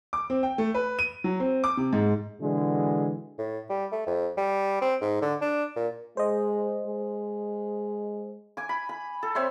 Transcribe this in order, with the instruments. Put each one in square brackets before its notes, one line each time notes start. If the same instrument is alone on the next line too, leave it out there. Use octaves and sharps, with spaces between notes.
[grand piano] D6
C4
G5
A3
B4
D#7
F#3
C4
D6
C3
G#2
[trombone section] B2 D3 E3 G#3
[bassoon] A2
G3
A3
F2
G3
C4
G#2
D3
D4
A#2
[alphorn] G#3 [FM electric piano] C5 D#5
[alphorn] G#3
[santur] G#5 D6
B5
B5
A4
C4 C#5 E5 C6